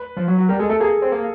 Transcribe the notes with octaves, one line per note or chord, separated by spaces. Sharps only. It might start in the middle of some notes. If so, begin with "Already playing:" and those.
Already playing: B4
F3
F#3
F#3
G3 A#4
G#3 A4
A3 A4
A#3 G#4
C4
A#3